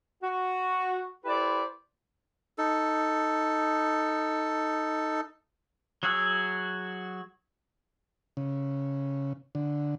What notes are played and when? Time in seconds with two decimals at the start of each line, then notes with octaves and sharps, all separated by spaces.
0.24 F#4
1.25 E4 G4 A4 B4 C5 D5
2.58 D#4 A4
6.03 F#3 F#4 G#4 E6
8.37 C#3
9.55 D3